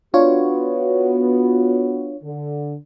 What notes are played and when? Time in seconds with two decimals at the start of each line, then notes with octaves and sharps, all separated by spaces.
0.14 B3 D4 F4 F#4 C#5
2.22 D3